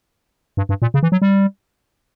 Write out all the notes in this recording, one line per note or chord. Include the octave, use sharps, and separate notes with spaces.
G2
G2
A#2
C#3
E3
F#3
G3